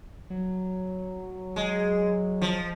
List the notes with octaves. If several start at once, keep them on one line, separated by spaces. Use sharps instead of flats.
F#3
G#3
F3